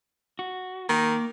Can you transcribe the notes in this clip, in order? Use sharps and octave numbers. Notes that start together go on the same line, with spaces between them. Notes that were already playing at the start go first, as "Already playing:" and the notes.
F#4
D#3 A#3